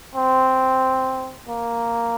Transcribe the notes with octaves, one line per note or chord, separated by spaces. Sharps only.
C4
A#3